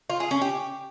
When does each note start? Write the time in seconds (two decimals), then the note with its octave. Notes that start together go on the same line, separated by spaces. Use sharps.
0.10 F4
0.20 G#4
0.31 C#4
0.42 G4